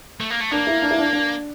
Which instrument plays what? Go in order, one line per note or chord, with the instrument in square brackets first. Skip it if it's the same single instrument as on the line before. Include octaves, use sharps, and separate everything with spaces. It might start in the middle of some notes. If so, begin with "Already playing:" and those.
[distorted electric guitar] A3
A#3
A3
[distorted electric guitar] A#3 [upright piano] D4
[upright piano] E4
D4
E4
D4
D4